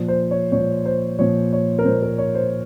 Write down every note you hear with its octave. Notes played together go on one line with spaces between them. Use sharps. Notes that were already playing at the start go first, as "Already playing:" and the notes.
Already playing: A#2 F3
C5
C#5
A#2 F3 C#5
C5
A#2 F3 C#5
C#5
A#4
A#2 F3 C5
A#4
C#5
C5